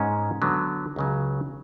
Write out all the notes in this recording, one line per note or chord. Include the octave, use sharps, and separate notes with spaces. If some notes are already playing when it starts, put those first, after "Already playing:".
Already playing: G#2 G#3 C#4
D3 F#3 B3
C#2 C#3 F#3